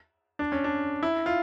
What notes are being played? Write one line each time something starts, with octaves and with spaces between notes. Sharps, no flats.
D4
C#4
D4
E4
F4